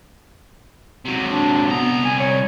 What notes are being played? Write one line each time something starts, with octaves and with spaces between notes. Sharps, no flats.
C3 F#3
D4
C2 B3 A#5
G#5
C#5